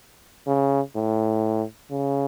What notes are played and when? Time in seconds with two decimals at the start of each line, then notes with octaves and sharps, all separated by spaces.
0.47 C#3
0.96 A2
1.91 C#3